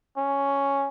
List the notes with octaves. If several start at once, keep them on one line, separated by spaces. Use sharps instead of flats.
C#4